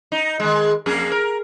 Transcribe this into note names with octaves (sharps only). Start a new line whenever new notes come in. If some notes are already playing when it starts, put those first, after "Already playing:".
D#4
D#3 G#3
F2 A#3 G#4
A#4